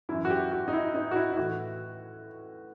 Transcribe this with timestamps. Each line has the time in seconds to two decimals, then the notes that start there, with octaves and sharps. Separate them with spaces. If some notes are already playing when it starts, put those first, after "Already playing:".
0.09 F#2 E3 E4
0.25 F#4
0.30 G4
0.52 F#4
0.68 D#4
0.73 E4
0.95 D#4
1.11 F#4
1.16 E4
1.32 E4
1.37 A2 E3 F#4